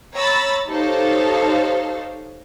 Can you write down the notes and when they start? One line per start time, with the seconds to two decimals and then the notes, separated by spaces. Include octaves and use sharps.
0.14 C#5 A#5 B5 E6 A6
0.69 D#4 G4 A4 C5 C#5 F5